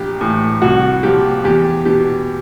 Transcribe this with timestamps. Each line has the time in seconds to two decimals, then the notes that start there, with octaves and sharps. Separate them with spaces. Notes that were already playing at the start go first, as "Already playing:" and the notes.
Already playing: A#1 G4
0.21 A2 E3
0.62 C2 F#4
1.03 A#2 F3 G4
1.44 E2 G4
1.85 B2 G4